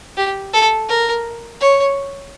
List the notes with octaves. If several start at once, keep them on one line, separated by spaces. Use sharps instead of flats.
G4
A4
A#4
C#5